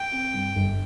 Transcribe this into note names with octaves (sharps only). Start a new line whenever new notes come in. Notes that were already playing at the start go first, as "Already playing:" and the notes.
Already playing: G5
C4
G2
G1